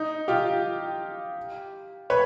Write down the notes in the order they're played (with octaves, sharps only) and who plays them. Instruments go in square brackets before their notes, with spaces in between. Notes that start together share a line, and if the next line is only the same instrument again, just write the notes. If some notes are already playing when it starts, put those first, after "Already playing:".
Already playing: [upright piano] D#4
F4 G4
B4 C#5